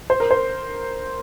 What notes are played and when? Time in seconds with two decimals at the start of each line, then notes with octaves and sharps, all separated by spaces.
0.10 C5
0.20 A#4
0.31 C5